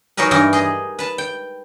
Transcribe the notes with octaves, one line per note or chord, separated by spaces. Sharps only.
F#3 D#4 G#4 A#4 B4
G2 E3 D#4 E4 A#4
G#4 D#5
B4 A5
G5